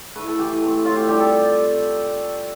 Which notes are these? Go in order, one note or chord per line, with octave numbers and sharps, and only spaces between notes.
A3 E4 B4
A4
E3 G4
A3 C4
A2 F4
G4
G3 D4 G4
A4